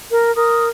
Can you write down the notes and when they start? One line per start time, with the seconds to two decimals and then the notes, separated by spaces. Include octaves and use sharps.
0.12 A#4
0.36 A#4 D#6